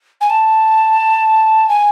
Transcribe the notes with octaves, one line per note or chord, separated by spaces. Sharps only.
G#5
A5
G#5